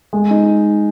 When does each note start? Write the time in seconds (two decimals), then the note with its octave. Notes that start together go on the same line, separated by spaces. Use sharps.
0.13 G#3
0.31 D#4